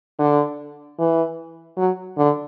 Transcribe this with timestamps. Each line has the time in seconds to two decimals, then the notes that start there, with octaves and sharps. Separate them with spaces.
0.19 D3
0.99 E3
1.77 F#3
2.17 D3